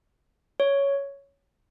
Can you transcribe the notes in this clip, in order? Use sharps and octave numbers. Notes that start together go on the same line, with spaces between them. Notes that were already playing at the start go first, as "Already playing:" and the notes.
C#5